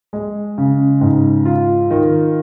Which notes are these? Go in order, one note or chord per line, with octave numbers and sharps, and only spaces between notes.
G#3
C#3
G#2
F4
D#3